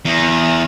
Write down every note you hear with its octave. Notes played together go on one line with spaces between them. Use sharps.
E2